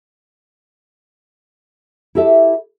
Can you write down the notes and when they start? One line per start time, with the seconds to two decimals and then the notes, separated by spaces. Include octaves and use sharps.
2.15 E4 G4 A4 E5